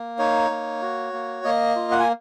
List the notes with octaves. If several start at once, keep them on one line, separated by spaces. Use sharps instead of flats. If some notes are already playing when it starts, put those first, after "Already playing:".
Already playing: A#3
D#4 C#5
A#3
F#4
A#3
A#3 D#5
F4
F#5
G#5